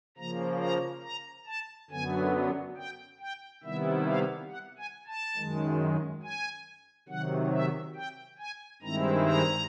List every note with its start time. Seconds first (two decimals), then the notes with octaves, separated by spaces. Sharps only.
0.17 C#3 F3 A#3 A#5
0.61 A#5
1.03 A#5
1.47 A5
1.90 F#2 D3 F#3 B3 G#5
2.77 G5
3.20 G5
3.63 C3 D#3 G3 B3 E4 E5
4.06 F5
4.50 F#5
4.78 G#5
5.07 A5
5.36 F#2 D#3 G#3
6.23 G#5
7.09 C3 D#3 F#3 F#5
7.52 E5
7.95 G5
8.39 G#5
8.82 G2 D#3 G#3 C4 E4 A#5
9.25 A#5